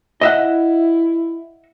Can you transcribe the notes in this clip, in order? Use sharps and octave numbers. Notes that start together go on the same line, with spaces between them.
E4 D#5 E5 F#5